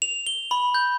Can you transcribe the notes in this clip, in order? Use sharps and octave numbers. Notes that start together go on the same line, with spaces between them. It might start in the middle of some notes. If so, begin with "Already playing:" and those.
F7
G7
B5
G6